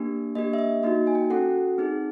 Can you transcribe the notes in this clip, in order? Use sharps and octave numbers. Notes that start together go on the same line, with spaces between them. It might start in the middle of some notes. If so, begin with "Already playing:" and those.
Already playing: A#3 D4 G4
A#3 D4 G4 D#5
E5
D#5
A#3 D#4 F#4 D#5
G#5
G5
C#4 F#4 A4 F#5
C4 D#4 G#4